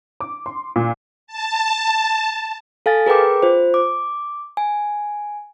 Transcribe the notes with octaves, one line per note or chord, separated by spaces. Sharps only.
D6
C6
A#2
A5
A4 F5 G#5 A6
G#4 A#4 B4 G5 D6
F4 C5
D6
G#5